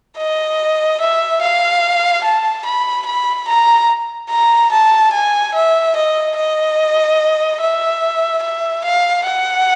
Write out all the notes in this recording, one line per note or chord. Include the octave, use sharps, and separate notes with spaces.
D#5
E5
F5
A5
B5
B5
A#5
A#5
A5
G#5
E5
D#5
D#5
E5
E5
F5
F#5